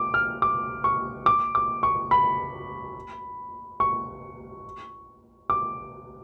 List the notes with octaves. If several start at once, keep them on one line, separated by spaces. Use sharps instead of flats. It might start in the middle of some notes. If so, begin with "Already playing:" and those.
Already playing: D6
F6
D6
C#6
D6
D6
C#6
B5
C#6
D6